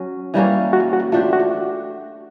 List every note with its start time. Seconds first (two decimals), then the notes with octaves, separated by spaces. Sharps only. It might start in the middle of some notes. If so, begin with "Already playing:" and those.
Already playing: F#3 C#4
0.34 E3 G3 A#3 C#4
0.73 F#4
0.93 F#4
1.12 A3 D4 F4 G4 C5
1.33 F#4